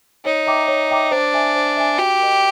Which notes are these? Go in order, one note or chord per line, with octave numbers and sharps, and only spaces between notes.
D#4 C#5
E5 G5 A#5 D6
C#5
E5 G5 A#5 D6
D4 C5
E5 G#5
C5
E5 G#5
F#4 G4
A#4 D#5